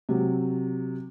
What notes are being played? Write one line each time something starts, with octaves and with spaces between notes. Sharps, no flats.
C3 F#3